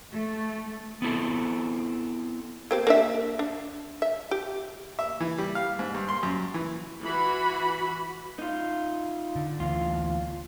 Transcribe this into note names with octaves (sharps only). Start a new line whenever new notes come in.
A3
B3 C4 E4 A4
A#3 C4 G4
A#3 D4 E5
D4
E5
G4
E5
E3
G3
F5
G#2
G2
C6
F#2
E3
E3 F#4 B5
D#4 F4
D3
D2 E3 F4